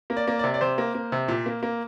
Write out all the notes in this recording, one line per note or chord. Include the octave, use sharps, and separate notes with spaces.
A#3
D5
A#3
C3 D5
D5
C3 C5
A#3
A#3
C3
A#2
A#3
A#3